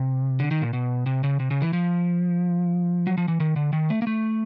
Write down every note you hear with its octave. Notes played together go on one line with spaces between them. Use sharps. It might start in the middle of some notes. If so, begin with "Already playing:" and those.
Already playing: C3
D3
D#3
A#2
B2
C3
C#3
C3
C#3
E3
F3
F#3
F3
E3
D#3
D3
D#3
A3
A#3
A3